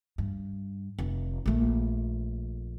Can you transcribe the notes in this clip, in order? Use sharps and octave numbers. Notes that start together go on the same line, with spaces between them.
G2
F1
A#1 A3